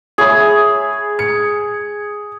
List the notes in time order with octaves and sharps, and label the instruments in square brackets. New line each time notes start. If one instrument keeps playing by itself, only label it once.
[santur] G#4 [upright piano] C#5 E5 B5
[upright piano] C#7